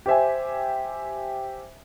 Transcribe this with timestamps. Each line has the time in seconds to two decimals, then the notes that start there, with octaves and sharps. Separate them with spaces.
0.06 G4 C5 E5 G#5